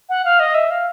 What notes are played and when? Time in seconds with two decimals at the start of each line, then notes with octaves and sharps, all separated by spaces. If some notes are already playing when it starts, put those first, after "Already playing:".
0.09 F#5
0.25 F5
0.40 D#5
0.55 E5
0.70 F5